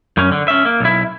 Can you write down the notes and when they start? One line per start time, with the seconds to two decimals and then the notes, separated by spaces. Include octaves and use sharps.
0.17 F#2 C#4
0.32 D3
0.48 C#4 E5
0.65 A#3
0.80 B1 E4